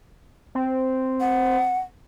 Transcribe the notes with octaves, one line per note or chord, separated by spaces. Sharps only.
C4
F#5